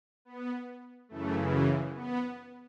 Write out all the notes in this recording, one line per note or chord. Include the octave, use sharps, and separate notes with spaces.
B3
F#2 C#3 E3 A3
B3